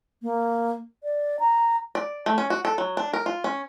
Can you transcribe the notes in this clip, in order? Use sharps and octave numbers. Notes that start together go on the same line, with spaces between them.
A#3
D5
A#5
D5
A3
C#4
F#4
A4
F#3
D4
A#4
F4
C#4